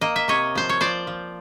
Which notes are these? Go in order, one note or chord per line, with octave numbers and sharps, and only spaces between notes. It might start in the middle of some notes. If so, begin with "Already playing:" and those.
A#3 D#5
E5
C3 C#5 D#5
F3 C5
C#5
F3 C5 D5
F3